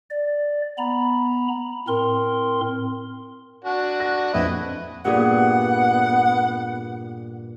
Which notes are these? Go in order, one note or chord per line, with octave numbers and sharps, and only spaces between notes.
D5
B3 A#5 B5
A2 C4 A#4 C6
D4 F#4
A#6
A#1 F2 E4 B4 D#5 E5
G2 A#2 B3 G#4 F#5